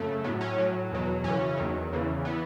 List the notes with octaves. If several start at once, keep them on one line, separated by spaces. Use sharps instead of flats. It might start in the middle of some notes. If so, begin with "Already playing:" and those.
Already playing: F#2 C#3 F#3 A3
A2 F#3 B3
C#4
A2 F#3
E2 B2 F#3
F#2 C#3 E3 C#4
E2 D#3 F#3
E2 C#3 E3
E3 B3